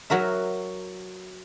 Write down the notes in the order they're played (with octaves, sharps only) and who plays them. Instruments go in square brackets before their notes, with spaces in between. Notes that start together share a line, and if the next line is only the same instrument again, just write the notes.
[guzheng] F#3 F#4 A#4 E5